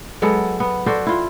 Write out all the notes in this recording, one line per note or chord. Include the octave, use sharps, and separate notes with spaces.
F#3 G#3 B3 A4
B3
F#4 A4 C5 D5
E4 F4